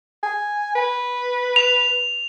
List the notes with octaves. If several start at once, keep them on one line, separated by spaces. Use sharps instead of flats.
G#5
B4
F7